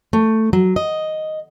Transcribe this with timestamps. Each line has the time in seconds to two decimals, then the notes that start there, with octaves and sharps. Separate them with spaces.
0.13 A3
0.53 F#3
0.76 D#5